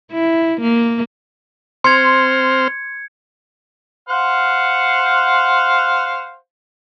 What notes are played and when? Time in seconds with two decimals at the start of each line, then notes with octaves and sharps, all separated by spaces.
0.12 E4
0.61 A#3
1.84 C4 C5 C6 F6 G#6 C#7
4.09 C5 F5 F#5